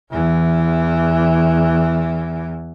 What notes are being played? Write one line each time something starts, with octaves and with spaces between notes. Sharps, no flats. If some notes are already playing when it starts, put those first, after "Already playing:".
E2 E3